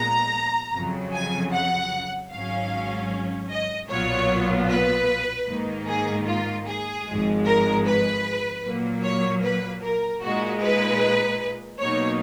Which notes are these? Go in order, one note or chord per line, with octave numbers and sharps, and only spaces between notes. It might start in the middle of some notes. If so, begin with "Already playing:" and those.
Already playing: A#1 A#2 G#3 B3 A#5
F2 C#3 F#3
G#5
F#5
G#1 G#2 F#3 C#4 F5
D#5
B1 A#2 F#3 B3 F4 C#5
B4
G#2 D#3 A#3 D#4
G#4
F4
G#4
G#1 G#2 F3 G#3
A#4
B4
A#2 F#3 A#3
C#5
B4
A#4
A#2 G#3 D#4 F#4
B4
B2 F#3 A#3 D#4 C#5